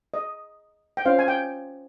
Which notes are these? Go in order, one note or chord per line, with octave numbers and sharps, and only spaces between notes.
D#5
G5
C#4 F4 C5 F5
G#5
G5